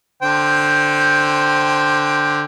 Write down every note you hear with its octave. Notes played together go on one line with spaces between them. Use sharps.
D3 C5 G5